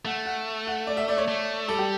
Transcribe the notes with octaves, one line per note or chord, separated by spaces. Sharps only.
A3 F#5
F#5
F#5
D5
E5
D5
C#5
A3
G3 A4
G4